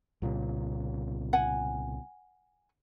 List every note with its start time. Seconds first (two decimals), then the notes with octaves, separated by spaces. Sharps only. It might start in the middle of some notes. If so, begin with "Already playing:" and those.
0.22 C2 A#2 C#3
1.33 F#5 G#5